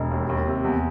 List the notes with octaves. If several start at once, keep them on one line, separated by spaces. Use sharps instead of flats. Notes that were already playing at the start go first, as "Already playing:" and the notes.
Already playing: E1
D#2
D#2
C3
E2